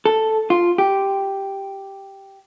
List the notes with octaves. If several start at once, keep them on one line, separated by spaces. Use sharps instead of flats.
A4
F4
G4